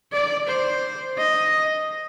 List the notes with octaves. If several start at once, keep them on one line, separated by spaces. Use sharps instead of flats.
D5
C5
D#5